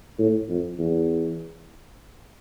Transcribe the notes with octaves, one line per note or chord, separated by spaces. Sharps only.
A2
F2
E2